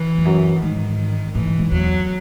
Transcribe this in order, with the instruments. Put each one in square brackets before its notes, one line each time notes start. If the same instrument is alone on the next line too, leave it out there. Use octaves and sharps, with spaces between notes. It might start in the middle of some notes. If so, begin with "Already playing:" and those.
Already playing: [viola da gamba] E3
[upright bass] E2
F#2
[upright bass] G#2 [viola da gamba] D#3
[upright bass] A2 [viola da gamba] E3
[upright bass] G#2
G#2
[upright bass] E2 [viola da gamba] F#3